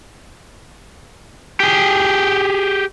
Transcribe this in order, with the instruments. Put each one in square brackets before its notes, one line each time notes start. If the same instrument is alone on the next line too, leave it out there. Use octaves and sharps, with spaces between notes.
[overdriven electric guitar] G4 G#4